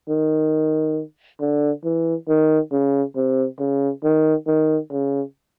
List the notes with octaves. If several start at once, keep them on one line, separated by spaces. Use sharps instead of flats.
D#3
D3
E3
D#3
C#3
C3
C#3
D#3
D#3
C#3